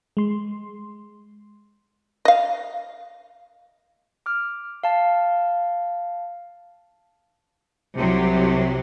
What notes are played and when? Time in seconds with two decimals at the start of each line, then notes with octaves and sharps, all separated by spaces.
0.17 G#3 C6
2.25 D#5 F5
4.26 D6 F6
4.84 F5 A5
7.95 C2 C3 F#3